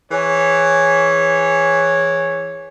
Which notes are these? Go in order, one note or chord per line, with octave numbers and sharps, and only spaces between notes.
E3 G#4 C#5